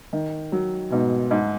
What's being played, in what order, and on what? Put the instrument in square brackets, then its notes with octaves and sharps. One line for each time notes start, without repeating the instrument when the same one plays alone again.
[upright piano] D#3
F#3
[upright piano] G#2 [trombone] B2
[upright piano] G#2